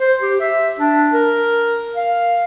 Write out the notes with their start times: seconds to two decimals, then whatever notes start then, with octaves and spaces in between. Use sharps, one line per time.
0.01 C5
0.21 G4
0.40 E5
0.79 D4
1.13 A#4
1.96 F5